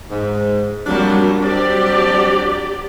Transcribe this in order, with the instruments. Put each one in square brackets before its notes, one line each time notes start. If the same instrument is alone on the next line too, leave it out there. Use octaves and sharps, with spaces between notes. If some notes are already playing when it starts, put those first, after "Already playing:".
[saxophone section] G#2
[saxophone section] F2 A#3 D4 [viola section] F#3 G3 A#4
[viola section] F#3 G4 D5 [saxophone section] G3 C4 D4